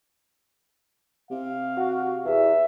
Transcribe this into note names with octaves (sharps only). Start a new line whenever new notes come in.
C3 F5
F#4
E2 E5